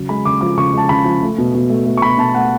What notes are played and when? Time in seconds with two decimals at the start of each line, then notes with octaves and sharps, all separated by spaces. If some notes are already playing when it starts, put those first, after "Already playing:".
Already playing: C#3 F#3
0.09 G#3 B5
0.25 C#3 D6
0.41 F3 D6
0.58 C#3 C#6
0.73 G#3 A5
0.89 C#3 B5
1.05 F3
1.23 A3
1.38 B2
1.54 B2
1.70 A3
1.86 A3
1.97 C#6
2.02 B2 B5
2.18 B2 A5
2.35 A3 F#5